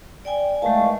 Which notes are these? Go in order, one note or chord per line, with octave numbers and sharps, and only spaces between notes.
D5 G5 G#5
E2 D#3 G#3 A3 F5 A5